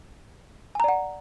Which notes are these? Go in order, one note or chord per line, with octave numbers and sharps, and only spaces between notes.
D5 F#5 G#5 A#5